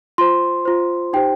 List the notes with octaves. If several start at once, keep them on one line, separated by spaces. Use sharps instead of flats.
F4 C5 C6
F4 C5
D#4 G4 C5 G5